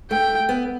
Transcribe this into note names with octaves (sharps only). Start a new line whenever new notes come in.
A3 G5
B3